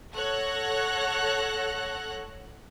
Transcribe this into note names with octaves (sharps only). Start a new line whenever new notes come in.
A4 C#5 F#5 F#6 A#6